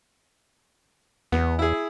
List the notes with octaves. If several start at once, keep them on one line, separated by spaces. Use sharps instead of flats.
E2 B3
E4 G#4